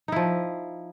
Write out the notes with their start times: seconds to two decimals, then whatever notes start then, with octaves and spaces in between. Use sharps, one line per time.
0.08 D#4
0.12 E4
0.16 F3